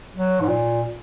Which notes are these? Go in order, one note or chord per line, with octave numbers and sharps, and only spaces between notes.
F#3
G#2
A#2